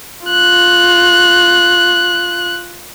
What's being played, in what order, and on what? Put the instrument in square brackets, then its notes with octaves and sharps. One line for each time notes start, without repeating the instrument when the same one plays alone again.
[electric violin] F4 F#6